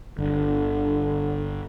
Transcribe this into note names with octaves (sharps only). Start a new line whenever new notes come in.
G1 D3